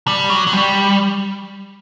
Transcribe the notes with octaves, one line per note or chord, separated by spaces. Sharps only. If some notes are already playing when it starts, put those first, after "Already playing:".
G3
F#3
F#3
G3